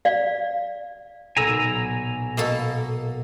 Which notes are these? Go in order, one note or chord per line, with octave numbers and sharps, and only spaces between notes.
D5 F5
B1 A#2 G#5 A#5 E6
B2 A#3 A4